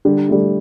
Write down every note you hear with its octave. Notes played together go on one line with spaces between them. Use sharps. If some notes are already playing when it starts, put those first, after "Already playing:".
D3 G3
A3
D3 G3